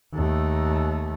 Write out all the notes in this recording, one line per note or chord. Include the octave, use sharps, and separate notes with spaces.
D#2 A3